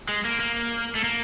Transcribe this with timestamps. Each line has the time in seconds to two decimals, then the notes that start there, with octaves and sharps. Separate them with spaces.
0.09 G#3
0.25 A#3
0.40 A#3
0.95 A3
1.04 A#3